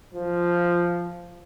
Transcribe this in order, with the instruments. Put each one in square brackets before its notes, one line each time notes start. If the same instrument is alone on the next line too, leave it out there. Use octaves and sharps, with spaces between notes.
[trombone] F3